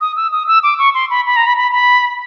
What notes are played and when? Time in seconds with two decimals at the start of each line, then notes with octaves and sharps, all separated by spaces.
0.01 D#6
0.17 E6
0.32 D#6
0.48 E6
0.63 D6
0.79 C#6
0.94 C6
1.10 B5
1.26 B5
1.36 A#5
1.47 B5
1.57 B5
1.72 B5